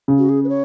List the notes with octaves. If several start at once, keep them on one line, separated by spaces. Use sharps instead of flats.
C#3
F#4
G#4
B4
C#5